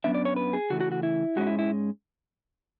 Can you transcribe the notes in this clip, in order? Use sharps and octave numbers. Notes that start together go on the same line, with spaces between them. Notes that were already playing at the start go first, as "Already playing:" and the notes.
F#2 E3 B3 D4 E5
D5
C#5
B4
G#4
C#3 E3 A3 F#4
F#4
F#4
E4
G#2 G#3 C#4 E4 F#4
E4
E4